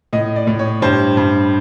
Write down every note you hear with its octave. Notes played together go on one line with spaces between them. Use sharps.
A2 D#5
D5
A2
C#5
G2 C5
G2